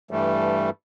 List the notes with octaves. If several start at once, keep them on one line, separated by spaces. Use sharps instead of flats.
G2 E3 G3 A3